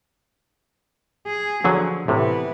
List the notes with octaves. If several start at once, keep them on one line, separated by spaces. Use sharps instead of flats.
G#4
D3 F3 F#3 G#4
A2 C3 E3 B3